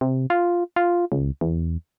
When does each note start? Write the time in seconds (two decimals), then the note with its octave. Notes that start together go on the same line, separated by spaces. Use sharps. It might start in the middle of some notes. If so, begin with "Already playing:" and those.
0.01 C3
0.30 F4
0.76 F4
1.12 C#2
1.41 E2